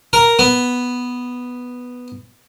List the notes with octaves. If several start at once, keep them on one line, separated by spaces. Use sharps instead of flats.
A#4
B3